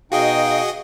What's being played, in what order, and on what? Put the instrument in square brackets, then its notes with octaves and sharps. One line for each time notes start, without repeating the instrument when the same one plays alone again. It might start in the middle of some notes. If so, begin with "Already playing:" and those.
[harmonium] B2 D#4 G5 [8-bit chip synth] F#4 G#4 D#5 [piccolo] F5